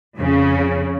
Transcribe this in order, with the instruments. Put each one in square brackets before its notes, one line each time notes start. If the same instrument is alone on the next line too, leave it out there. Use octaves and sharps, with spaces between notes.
[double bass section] F2 [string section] C#3